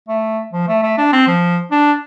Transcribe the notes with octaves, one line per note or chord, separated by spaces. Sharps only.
A3
F3
A3
A3
D4
C4
F3
D4